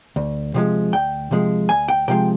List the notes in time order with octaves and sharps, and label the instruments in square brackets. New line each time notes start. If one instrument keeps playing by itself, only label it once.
[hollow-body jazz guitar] D2
C3 F3 G#3
D2 G5
C3 F3 G#3
D2 G#5
G5
C3 F3 G#3 G5